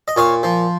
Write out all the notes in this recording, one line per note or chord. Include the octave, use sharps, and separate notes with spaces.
D#5
A#2 C#5 F5
F3